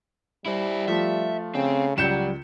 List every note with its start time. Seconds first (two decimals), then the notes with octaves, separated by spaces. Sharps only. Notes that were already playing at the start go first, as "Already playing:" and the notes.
0.46 G3 E4 C5
0.88 F3 A3 F4 E5
1.55 C#3 C4
1.98 C#2 F#3 G3 G6 C#7 E7